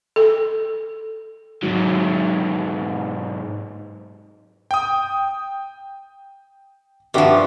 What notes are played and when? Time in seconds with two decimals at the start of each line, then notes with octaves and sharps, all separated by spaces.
0.16 A4
1.63 G#2 F#3
4.71 G5 D#6
7.14 G2 F3 F#4 G4 E5